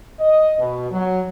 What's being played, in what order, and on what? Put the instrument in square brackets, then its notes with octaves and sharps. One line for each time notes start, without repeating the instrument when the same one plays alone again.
[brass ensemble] D#5
B2
F#3